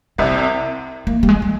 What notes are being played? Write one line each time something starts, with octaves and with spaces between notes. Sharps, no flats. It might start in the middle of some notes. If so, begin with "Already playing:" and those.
C2 C3 C4
A#3
G3
G#3
G#3